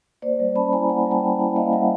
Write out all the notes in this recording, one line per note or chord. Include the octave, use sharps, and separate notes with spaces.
A#3 C5 D5
G3
C#4 A5 B5
E4 G#5 A#5
A#3 F#5 G#5
G3
G5 A5
C#4
E4
A#3 D#5 F5
G3 E5 F#5